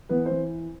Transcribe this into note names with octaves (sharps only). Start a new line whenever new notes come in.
E3 B3 B4
C4 C5
E3